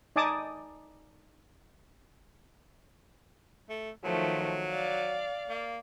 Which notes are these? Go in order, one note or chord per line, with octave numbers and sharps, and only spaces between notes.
D#4 D5 G#5 A5 D6 D#6
A3
D#3 F3 F#3 A3
D5 F5
A#3